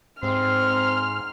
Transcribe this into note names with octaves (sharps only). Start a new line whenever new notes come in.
G#2 C4 C6 F6